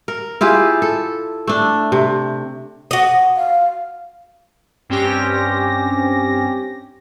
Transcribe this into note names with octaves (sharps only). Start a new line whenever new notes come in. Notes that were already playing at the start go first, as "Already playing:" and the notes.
A#4
E4 F4 G4 G#4
A4
A3 D4
C3
F#4 D#5
F5
G2 C4 C#4 G4 A#6